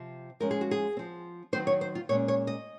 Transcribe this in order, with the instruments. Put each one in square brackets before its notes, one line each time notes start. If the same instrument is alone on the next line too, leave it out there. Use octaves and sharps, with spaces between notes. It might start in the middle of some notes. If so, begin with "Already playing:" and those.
Already playing: [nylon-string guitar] C3 F3 C4
F3 G#3 C#4 A#4
G#4
F#4
G#4
F3 C4
D#3 F#3 C4 C5
C#5
C5
F4
A#2 G#3 C#4 C#5
C#5
D#5